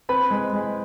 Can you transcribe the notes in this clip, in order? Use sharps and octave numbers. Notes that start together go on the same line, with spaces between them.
C4 B4 B5
G#3
G#3